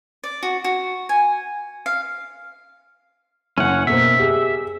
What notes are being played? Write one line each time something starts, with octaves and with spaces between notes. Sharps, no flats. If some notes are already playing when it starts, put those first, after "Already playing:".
D5
F#4
F#4
G#5
F5
F#1 C#4 F#5
B2 A#3 C5 E5
G4 G#4